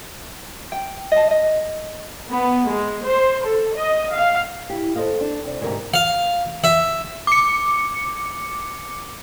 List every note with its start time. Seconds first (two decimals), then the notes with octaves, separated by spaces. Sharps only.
0.72 G5
1.12 D#5 A5
1.31 D#5
2.30 B3
2.69 G#3
3.06 C5
3.45 A4
3.77 D#5
4.13 F5
4.70 E4 G4
4.96 A4 A#4 C5 D#5 F5
5.21 D4
5.46 C3 D5
5.61 D2 G#2 C3 A#4 E5
5.94 F5
6.64 E5
7.27 D6 C#7